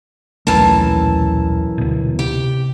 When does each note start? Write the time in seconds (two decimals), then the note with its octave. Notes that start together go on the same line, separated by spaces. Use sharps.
0.47 D#1 B1 F#2 E3 A3 A5
1.78 D2 B2
2.19 C3 G4